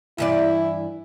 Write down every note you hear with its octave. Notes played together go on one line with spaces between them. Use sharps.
G2 E3 E4 D5